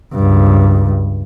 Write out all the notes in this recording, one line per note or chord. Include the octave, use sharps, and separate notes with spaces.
C#2 G2